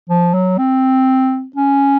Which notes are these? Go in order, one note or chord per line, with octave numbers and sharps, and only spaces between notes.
F3
F#3
C4
C#4